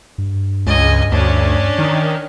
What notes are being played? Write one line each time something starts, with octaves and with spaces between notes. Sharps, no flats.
G2
C#2 D#5 G#5
D2 C#4 D4
D#3